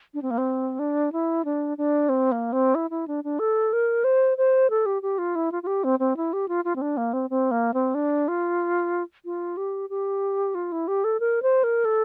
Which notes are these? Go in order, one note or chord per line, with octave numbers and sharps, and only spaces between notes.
D4
C4
A#3
C4
D4
E4
D4
D4
C4
A#3
C4
E4
E4
D4
D4
A4
A#4
C5
C5
A4
G4
G4
F4
E4
F4
F4
G4
C4
C4
E4
G4
F4
F4
C4
D4
A#3
C4
C4
A#3
C4
D4
F4
F4
G4
G4
F4
E4
G4
A4
A#4
C5
A#4
A4